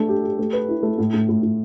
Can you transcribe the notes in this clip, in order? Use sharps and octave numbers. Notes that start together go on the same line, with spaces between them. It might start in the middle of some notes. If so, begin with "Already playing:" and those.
Already playing: A3 D4
G4
G4
A3
B4
E4
A3
A2
A2
A2
A2